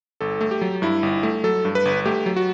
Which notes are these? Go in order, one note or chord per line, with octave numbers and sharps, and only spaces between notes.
G1 A4
A3
G4
F#3
G2 E4
G1
A3
F#3 A4
G2
B4
G1
A3 G4
F#3
F#4